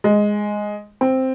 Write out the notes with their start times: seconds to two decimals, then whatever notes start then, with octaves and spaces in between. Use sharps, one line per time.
0.04 G#3
1.01 C4